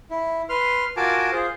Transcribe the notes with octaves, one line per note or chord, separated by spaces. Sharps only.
E4
B4 C6 F6
F4 F#4 A#4 G#5 A5 D6
F4 G#4 C5